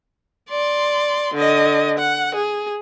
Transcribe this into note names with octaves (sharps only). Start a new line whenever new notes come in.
D5 C6
D3 D#5
F#5
G#4